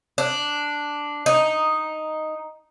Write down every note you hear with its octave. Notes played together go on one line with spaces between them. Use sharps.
D4
D#4